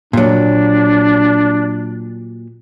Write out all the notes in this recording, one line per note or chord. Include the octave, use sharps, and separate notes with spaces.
A#2 F#3 D4